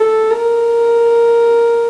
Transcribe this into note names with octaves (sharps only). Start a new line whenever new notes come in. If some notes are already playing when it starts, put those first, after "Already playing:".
Already playing: A4
A#4